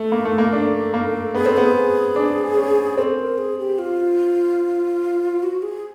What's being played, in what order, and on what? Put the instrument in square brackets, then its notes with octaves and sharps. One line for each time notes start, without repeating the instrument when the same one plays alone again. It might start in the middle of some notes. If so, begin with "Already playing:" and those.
Already playing: [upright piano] A3 [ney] A4
[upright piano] A#3
A3
A#3
D4
A#3
[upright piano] B3 [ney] G#4
[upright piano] C4 [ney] A4
[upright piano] B3 [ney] G#4
[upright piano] D4
C#4
[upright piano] C4 [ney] A4 A#4
[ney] A#4
G#4
G4
F4
F#4
G#4